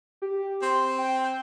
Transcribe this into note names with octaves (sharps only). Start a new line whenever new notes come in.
G4
C4 C6
G5
G6